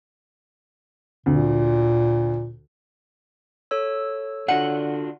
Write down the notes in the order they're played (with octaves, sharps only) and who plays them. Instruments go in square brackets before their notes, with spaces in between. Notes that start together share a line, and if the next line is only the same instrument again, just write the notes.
[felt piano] D2 [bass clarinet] A#2
[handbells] A4 C#5 E6
[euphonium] D3 [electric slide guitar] D4 F4 F#4 [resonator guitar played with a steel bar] F#5